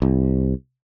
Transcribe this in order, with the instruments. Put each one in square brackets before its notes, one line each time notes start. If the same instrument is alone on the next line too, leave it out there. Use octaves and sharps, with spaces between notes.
[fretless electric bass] C2